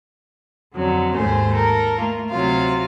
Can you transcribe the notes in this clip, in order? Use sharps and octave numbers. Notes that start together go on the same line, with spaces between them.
F2 D3 F#3
D#2 G#2 A3 C5 G#5
A4 A#4
A3 A#3 F4
D2 C3 F#3 F4 F5